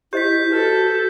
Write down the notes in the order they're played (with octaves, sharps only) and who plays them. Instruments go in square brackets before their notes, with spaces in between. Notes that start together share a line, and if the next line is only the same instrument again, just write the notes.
[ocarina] E4 [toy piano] G4 C5 D#5 [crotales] G6 B6
[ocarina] F#4 [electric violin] A4 [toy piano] B4